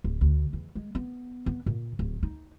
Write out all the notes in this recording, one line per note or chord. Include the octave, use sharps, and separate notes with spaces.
D1
D2
E2
G#3
B3
B3
A#2
D1
D#4